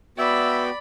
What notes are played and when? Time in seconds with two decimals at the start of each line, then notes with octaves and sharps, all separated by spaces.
0.18 B3 F#4 D5 E5 G5 B5